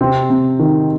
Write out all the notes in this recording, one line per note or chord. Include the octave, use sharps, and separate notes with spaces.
C3 C4
C3
D#3